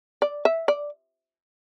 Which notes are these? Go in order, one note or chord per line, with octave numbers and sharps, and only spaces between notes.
D5
E5
D5